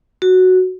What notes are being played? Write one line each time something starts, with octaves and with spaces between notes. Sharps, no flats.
F#4